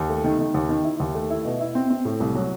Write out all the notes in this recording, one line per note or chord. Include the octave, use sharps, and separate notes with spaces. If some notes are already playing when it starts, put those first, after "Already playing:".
Already playing: D#2
A3
D#3
D#3
D#2
D#3
E4
D#2
A3
E4
B2
E4
C4
C4
A2
C2
F#3